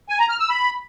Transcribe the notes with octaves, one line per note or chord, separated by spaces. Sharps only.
G#5
A#5
F6
E6
B5